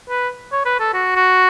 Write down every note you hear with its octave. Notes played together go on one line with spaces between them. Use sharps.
B4
C#5
B4
A4
F#4
F#4